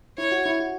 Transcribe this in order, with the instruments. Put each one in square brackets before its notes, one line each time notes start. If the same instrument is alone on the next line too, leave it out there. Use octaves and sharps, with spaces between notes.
[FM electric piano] E4 [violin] C#5
[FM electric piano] F#4
E4
F#4